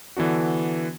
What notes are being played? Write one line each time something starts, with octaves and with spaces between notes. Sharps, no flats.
D3 E3 B3 D4 F#4